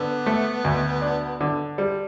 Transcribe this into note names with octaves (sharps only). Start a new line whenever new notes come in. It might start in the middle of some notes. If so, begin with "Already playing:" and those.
Already playing: D3 B3
A3
D2
D4
D3
G3